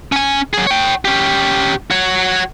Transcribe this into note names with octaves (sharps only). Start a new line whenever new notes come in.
C#4 G#5
F#3 G#4
C#5 G5
C#4 G4
F#4 C#5